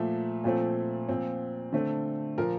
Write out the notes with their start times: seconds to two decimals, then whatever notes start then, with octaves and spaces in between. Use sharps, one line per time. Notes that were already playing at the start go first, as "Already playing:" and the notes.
Already playing: A#2 F3 A3 E5
0.44 A#2 F3 A3 C4
1.09 A#2 F3 C4
1.72 D3 A3 C4
2.37 A#2 F3 A#3 A#4